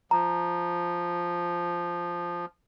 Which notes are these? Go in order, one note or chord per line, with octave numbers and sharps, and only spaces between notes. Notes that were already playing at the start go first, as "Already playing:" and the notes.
F3 A#5